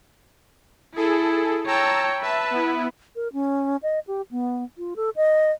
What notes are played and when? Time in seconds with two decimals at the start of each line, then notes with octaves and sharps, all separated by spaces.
0.95 E4 G#4 A4
1.66 C#5 G5 A5 A#5 E6
2.22 B4 E5 A5
2.50 B3 E4
3.16 A#4
3.33 C#4
3.83 D#5
4.07 G4
4.31 B3
4.78 F4
4.96 A4
5.16 D#5